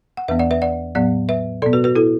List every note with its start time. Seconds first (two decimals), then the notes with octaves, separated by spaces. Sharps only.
0.17 F#5
0.28 E2 E3 B3 B4 E5
0.39 D5 F#5
0.51 B4 E5
0.62 D5 F#5
0.95 A2 F#3 B3 D5 F#5
1.29 B4 E5
1.62 B2 B3 A4 D5
1.73 F#4 B4
1.84 F#4 B4
1.95 E4 A4